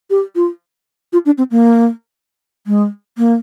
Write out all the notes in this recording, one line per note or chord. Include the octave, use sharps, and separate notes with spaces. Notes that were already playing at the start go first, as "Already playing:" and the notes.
G4
F4
F4
D4
C4
A#3
G#3
A#3